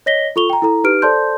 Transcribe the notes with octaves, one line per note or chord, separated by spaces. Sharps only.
C#5 D#5 A#6 B6 G7
F4 A4 C#6 F7 G7
G5 A#5
E4 A4 A#5
D#4 G4 B4 F6 D7
A4 C5 D5 A5 C6 G6